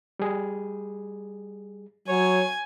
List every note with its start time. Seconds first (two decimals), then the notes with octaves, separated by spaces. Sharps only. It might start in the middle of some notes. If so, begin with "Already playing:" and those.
0.19 G3 G#4
2.08 F#3 C#5 G#5